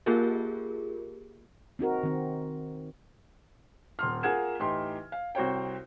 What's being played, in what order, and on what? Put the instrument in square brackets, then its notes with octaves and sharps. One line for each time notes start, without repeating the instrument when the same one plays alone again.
[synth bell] A#3 F4 G4 G#4 A#4
[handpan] C4 D#4 F#4 A#4
D#3 C4
[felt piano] D#1 C6 F6
A#3 F4 G#4 F#5 G#6 E7
A2 E3 D#4 G4 C6
F5
C2 F#4 C5 C#5 G5